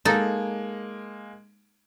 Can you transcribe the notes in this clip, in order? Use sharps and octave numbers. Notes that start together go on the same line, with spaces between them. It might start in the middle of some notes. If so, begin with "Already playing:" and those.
G#3 A#3 D#4 A4